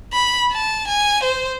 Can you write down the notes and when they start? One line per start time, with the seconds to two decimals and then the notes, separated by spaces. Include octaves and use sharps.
0.13 B5
0.53 A5
0.88 G#5
1.24 C5